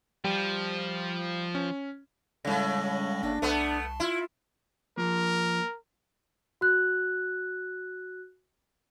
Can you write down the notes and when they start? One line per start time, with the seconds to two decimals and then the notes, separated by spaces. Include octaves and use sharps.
0.24 F3 G3 G5
1.55 C#4
2.45 A2 C#3 G3 G#3 A#6
3.23 G1 A#3 D4 A#6
3.42 C2 A3 B3 A5
4.00 E4 F4
4.97 F3 A#3 A#4
6.61 F#4 F#6